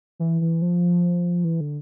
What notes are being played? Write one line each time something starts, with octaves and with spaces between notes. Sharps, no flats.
E3
E3
F3
E3
D3